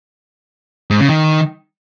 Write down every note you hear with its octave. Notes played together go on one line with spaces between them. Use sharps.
G#2
C#3
D#3